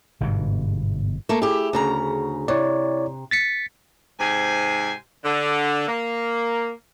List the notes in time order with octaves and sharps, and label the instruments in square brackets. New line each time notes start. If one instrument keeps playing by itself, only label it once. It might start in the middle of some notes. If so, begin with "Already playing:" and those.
[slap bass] G1 G#2 B2
[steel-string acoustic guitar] A3 A#3
[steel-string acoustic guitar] E4 G4 [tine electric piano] G#4
[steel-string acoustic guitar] D2 C#3 A#5
[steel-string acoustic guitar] C3 [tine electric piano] E4 C#5 D5
[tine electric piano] A6 B6 C#7
[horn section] G#2 C3 C5 G#5
D3
A#3